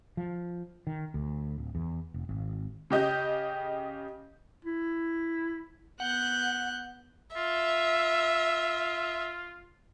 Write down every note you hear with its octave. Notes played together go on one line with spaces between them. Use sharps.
F3
D#3
D2
D1
E2
F1
G#1
C#3 G4 D#5 G6
E4
B3 F#5 F#6 G6
F4 E5